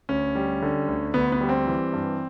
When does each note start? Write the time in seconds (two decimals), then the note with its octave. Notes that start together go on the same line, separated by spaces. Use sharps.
0.09 D2 C#4
0.35 G3
0.62 D3
0.88 D2
1.14 D2 B3
1.32 B3
1.41 G3
1.49 C4
1.67 E3
1.93 G2